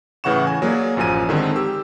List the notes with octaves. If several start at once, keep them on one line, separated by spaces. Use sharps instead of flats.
A2 C#3 E3 F#5 C#6 E7
G#5
F#3 A#3 G#4 D5
A1 F#2 F3 G#5 D#7
D3 D#3 G#3 C4
G4 E6